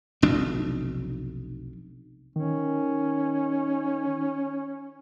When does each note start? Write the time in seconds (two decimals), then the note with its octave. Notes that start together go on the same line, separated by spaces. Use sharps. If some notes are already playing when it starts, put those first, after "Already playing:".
0.22 F1 B1 D4
2.36 D#3 C#4